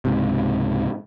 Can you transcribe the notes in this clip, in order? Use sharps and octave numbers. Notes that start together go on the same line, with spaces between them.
C#2 G#2 C3